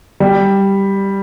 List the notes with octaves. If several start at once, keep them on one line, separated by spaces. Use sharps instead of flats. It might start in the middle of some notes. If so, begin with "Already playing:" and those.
G3